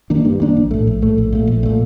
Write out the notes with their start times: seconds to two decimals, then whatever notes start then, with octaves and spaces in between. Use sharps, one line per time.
0.10 D#3 A#3 D4
0.25 G2
0.40 D#3 A#3 D4
0.57 A#1
0.71 A2 A3
0.87 A#1
1.02 A2 A3
1.18 A#1
1.33 A#2 A3
1.47 A#1
1.63 A#2 A3